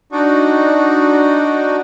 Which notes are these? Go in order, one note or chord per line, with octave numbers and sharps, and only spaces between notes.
D4 D#4 F#4